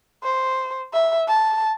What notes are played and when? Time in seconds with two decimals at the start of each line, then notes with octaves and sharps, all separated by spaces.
0.23 C5
0.93 E5
1.28 A5